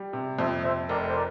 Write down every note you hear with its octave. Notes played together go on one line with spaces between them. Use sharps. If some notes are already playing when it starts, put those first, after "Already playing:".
Already playing: G3
C3
F2 C5 E5
F2 C5 E5
F1 A#4 D5
C5
A#4 D5